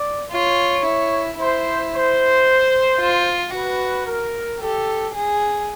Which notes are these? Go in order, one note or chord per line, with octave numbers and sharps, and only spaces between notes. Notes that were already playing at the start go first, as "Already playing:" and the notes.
Already playing: D5
F4 C#5
E4
E4 C5
C5
F4
F#4 B4
A#4
G4 A4
G#4